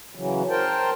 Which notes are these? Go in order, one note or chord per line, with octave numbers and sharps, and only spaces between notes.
C#3 E3 F#3
A#4 C5 G5 A5